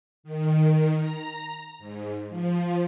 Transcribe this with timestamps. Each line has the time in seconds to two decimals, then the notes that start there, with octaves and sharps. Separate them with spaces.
0.23 D#3
0.95 A#5
1.79 G#2
2.29 F3